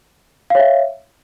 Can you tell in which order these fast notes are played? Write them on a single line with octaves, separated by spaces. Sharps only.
F5 C#5 E5